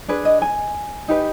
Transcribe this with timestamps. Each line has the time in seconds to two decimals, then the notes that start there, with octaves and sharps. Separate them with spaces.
0.08 D4 G#4 B4
0.25 D#5
0.42 G#5
1.08 D#4 G4 B4